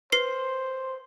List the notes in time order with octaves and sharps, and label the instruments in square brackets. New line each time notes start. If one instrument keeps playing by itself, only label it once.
[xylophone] B4 C7 [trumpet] C5